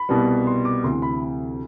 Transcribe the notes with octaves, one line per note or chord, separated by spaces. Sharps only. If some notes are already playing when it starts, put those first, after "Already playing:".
Already playing: B5
C2 B2 G3 B3
C6
D6
D2 C3 E3 C6
B5